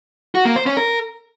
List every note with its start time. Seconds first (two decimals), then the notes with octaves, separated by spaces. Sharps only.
0.35 F#4
0.45 A#3
0.56 C5
0.66 C#4
0.77 A#4